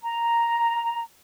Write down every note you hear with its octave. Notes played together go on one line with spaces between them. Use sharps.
A#5